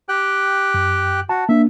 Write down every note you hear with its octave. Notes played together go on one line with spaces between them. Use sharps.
G4 G5 F#6
F#2
F#4 A5
A#3 D4 E5